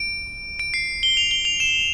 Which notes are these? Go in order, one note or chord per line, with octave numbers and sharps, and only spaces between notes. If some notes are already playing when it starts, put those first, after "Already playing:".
Already playing: D7
D7
C7
G7
F7
G7
F7
E7